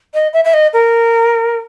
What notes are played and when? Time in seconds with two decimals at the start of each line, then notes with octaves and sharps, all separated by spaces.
0.14 D#5
0.33 E5
0.45 E5
0.54 D#5
0.73 A#4